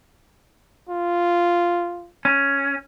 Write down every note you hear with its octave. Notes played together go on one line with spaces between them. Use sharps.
F4
C#4